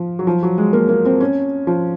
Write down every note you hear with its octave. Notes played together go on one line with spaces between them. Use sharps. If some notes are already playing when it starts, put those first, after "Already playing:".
Already playing: F3
F#3
F3
F#3
G#3
A#3
A#3
C4
C#4
F3